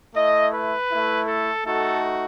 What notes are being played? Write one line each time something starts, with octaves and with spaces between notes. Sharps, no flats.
A3 E4 D#5
B4
E4
A3
A4
A3 D#4 F#4 A4